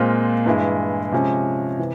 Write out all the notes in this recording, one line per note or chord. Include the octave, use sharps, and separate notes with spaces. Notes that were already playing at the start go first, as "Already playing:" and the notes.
Already playing: A#2 G#3 C4 F4
G2 E3 G#3 E4
C3 F3 G#3 C#4
C3 E3